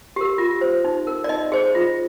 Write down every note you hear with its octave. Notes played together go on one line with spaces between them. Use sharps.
G4 A#4
F4
C5
D#4
A#4
D5
D#4 D#5
G#4 C5
F4